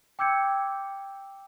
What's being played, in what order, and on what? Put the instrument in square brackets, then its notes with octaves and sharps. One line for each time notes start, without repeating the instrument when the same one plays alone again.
[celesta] G5 D6 E6 G6 G#6 C#7